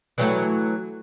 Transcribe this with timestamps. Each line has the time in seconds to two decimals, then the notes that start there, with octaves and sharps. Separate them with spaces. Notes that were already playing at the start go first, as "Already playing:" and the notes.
0.18 E3 F#3 A3